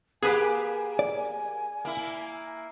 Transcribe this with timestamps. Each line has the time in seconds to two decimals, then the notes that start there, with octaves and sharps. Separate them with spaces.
0.23 A#3 G4 G#4 B4 G#5
0.99 D5
1.85 A#3 E4